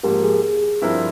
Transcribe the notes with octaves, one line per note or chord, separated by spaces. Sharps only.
G#2 F3 A#3 G4 A#4
G#4
G#4
G2 F3 C4 E4 A#4